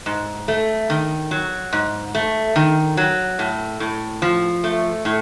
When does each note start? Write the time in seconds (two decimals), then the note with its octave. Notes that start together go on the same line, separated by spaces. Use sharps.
0.06 G#2
0.48 A3
0.90 D#3
1.31 F#3
1.73 G#2
2.15 A3
2.56 D#3
2.97 F#3
3.39 A2
3.80 A2
4.22 F3
4.64 A3
5.05 A2